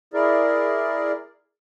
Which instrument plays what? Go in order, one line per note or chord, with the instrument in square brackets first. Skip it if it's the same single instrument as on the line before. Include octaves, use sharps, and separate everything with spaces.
[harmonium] E4 G#4 A#4 D5